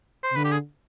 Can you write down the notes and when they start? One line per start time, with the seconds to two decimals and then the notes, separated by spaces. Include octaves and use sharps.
0.24 C5
0.30 C3
0.36 D3 B4
0.45 G4
0.52 G#4